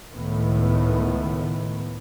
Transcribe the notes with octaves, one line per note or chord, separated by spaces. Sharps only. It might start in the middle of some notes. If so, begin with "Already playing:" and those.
C#2 A2 D#3 B3